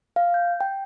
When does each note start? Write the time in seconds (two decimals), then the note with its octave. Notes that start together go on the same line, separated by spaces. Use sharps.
0.16 F5
0.34 G6
0.61 G5